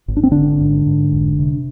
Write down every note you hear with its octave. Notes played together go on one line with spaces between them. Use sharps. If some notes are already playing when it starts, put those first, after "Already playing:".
G#1
D4
C4
G#1 D3 D4
G#2
G#2
F1
C3